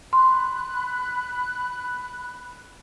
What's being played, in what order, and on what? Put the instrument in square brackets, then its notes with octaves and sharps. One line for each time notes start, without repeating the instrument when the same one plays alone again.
[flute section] B5 F#6 [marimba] C6